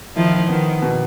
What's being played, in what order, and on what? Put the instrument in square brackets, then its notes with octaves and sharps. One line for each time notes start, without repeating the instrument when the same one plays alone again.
[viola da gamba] D#3 F3 [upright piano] E4
[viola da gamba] D#3 [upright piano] B3
[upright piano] B2